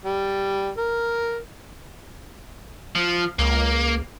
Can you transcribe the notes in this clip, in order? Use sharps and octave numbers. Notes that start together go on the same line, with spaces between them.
G3
A#4
F3
C#2 A#3